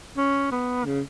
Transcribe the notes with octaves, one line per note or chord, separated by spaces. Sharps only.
C#4
B3
C#3